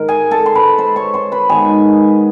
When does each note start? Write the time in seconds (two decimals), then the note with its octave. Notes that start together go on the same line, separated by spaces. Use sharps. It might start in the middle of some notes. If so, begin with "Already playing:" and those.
Already playing: G#2 D#3 A#4
0.08 G#4 G#5
0.31 A4 A5
0.46 C6
0.55 B4 B5
0.78 C5 C6
0.96 C#5 C#6
1.14 C5 C6
1.32 B4 B5
1.49 D#3 G#3 B3 G#4 G#5